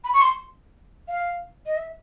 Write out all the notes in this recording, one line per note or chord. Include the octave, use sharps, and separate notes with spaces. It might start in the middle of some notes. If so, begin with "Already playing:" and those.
B5
C#6
C6
F5
D#5
E5